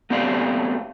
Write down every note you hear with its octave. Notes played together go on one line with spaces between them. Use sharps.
A3 B3 C4 G4 D5 F5